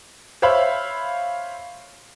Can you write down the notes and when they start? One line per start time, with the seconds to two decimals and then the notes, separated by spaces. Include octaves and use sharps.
0.42 C5 C#5 E5 F5 B5